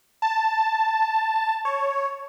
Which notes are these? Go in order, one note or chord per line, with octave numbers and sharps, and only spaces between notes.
A5
C#5